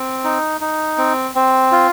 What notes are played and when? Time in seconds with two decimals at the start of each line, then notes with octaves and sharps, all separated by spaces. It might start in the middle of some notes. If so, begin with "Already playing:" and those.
Already playing: C4
0.24 D#4
0.61 D#4
0.98 C4
1.35 C4
1.72 F4